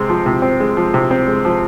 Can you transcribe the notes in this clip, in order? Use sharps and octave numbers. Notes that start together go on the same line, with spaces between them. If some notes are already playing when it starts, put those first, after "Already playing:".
Already playing: C3 G#3 C4
F3
C3
C4
G#3
F3
C3
C4
G#3
F3